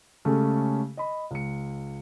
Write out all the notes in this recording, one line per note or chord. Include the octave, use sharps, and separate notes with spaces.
C#3 G#3 A3 C#4 G4 A4
D#5 B5
C#2 C#7